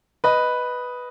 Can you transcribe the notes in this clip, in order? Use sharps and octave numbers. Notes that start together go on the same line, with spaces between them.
B4 D#5